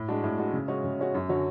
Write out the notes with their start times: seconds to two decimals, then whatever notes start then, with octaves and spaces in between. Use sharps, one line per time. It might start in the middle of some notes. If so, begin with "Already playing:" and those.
Already playing: A2
0.08 G#3 D4 F#4
0.24 A2
0.38 G#3 D4 F#4
0.53 C#3
0.68 G#3 C#4 F#4
0.84 C#3
0.99 G#3 C#4 F#4
1.14 F#2
1.29 D3 F#3 C#4 F#4